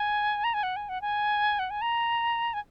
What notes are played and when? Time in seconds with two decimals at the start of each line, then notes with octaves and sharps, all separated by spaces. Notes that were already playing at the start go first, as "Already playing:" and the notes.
Already playing: G#5
0.44 A#5
0.54 G#5
0.63 F#5
0.76 G#5
0.89 F#5
1.02 G#5
1.59 F#5
1.70 G#5
1.81 A#5
2.54 G#5